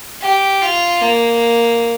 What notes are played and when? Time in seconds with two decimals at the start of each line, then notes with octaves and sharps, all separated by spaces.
0.22 G4
0.62 F4
1.02 A#3